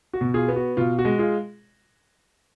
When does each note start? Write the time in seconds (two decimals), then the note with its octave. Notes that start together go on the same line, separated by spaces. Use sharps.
0.13 F#4
0.21 B2
0.34 F4 G#4
0.49 B3
0.56 F#4
0.77 B2 F4
0.99 F#4
1.05 G#3
1.19 F4 G#4